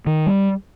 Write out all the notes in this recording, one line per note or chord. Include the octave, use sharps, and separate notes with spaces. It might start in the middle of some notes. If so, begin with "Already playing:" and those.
D#3
G3